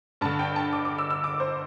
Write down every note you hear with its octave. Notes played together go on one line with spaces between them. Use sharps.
G2 D3 A5
G5
A5
D6
D6
E6
E6
D6
C5